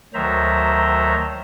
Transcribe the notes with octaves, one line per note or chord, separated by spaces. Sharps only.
D2 D#3 F#3 C5 E5 A#5